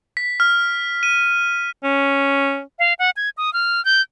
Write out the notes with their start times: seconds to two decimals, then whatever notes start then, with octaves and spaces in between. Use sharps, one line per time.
0.17 B6
0.40 F6
1.03 D#7
1.84 C#4
2.79 F5
2.99 F#5
3.17 G#6
3.37 D#6
3.53 F6
3.85 G6